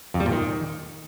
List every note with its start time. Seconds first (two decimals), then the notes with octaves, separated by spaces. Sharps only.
0.14 F2
0.20 G3
0.26 A#2
0.32 D#3